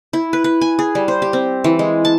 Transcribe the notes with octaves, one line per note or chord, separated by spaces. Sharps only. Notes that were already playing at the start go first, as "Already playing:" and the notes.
E4
B4
B4
G#5
G#4
G3
C5
G4
C4
E3
G#3
A5